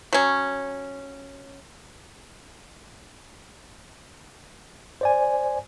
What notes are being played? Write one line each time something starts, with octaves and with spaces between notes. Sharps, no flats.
F#3 C#4
C5 D5 G#5